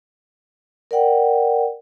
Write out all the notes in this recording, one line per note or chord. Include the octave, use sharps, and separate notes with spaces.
A#4 D5 F#5 G5